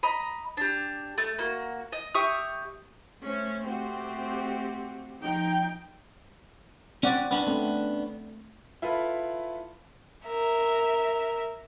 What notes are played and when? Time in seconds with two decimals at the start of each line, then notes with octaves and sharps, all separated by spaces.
0.03 D#5 A#5 B5
0.57 D4 G4
1.18 A3
1.39 A#3 F#4
1.92 D#5
2.15 G4 E5 C#6 D#6
3.23 A3 C#4 C5
3.65 A3 C4 F#4 G4
5.22 F3 D#4 G5
7.03 C4 C#4 D5 F#5
7.31 B3 C#4 D4
7.47 A3 C4
8.82 E4 F4 A4 B4
10.27 A#4 E5